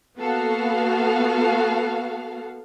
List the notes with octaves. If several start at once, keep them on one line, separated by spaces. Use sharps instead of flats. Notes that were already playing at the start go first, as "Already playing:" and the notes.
A#3 B3 F#4 A4 F5 F#5